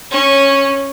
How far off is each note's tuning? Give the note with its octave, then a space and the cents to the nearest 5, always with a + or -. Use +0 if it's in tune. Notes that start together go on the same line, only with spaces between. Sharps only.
C#4 -10